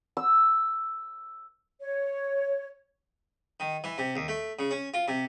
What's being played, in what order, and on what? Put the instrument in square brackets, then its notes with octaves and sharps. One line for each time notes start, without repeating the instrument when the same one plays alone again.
[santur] E6
[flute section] C#5
[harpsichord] D#3
E3
C3
D#2
A3
C#3
C#4
F4
C3